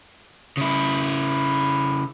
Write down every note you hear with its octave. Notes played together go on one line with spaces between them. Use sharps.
C#3 E4